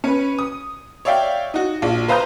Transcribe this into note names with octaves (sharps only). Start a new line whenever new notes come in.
C#4 B4
D#6
C#5 D5 E5 F5 G5
D#4 F#4
A#1 F4
B4 C5 F5 A#5 D#6 G6